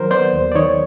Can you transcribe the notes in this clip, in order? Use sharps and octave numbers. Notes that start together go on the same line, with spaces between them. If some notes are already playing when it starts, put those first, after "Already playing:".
Already playing: D#3 F#3 A#4 C5
B3 C5 D5
D#2
D5
D#3 C#5 D#5